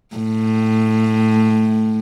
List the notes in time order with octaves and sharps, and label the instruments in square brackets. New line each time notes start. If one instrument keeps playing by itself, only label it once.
[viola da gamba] A2